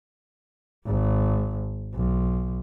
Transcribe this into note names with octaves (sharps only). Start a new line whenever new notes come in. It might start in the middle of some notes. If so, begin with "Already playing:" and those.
G#1
B1